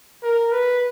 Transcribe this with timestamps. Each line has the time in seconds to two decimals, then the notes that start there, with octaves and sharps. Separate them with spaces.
0.23 A#4
0.52 B4